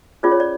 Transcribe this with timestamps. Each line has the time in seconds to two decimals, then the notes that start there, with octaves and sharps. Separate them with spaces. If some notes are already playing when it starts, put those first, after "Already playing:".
0.23 C#4 F4 G#4 C5 D5
0.32 C#5
0.40 D5